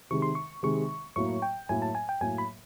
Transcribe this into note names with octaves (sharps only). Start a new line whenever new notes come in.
C3 D#3 G#3 C#6
C6
C#6
C3 D#3 G#3 C#6
A2 F#3 A#3 C#6
G5
A2 F#3 A#3 G#5
A5
G#5
G5
A2 F#3 A#3 G#5
B5